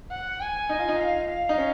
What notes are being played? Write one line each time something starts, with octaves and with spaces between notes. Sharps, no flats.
F#5
G#5
D#4
F4
D#4
F5
F5
D#4
C#4